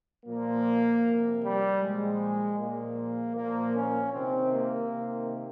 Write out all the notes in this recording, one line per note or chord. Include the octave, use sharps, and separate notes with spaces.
A#2 F3 A#3
C3 F3
G3
A#2 F3 G#3
A#2 F3 A#3
A#2 F3 A#3
C#4
C3 D#3 C4
A#3
C3 D#3